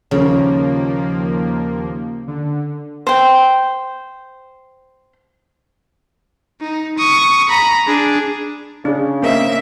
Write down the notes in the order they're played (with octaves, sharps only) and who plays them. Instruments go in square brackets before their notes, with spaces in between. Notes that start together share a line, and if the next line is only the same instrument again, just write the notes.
[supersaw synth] D#2 F3 A#3 [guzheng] C#3
[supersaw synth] D3
[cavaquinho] C5 G5
[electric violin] D#4
C#6 D#6
A#5 B5
D4 G#4
[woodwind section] C#3 [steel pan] D4 G#4
[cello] A#3 E5 [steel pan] C4 A#4 D#5